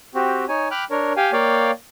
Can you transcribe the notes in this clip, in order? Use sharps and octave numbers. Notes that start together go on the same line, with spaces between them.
C4 F#4 G4
D#4 C#5 G#5
G5 B5 D6 F6 F#6
D4 A#4 C#5
G4 F5 G5 G#5
A#3 C#5 D5 F5 G5